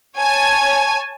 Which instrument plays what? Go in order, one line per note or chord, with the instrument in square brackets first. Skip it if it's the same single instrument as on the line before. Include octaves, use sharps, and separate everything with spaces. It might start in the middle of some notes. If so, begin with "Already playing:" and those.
[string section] C#5 G#5 A5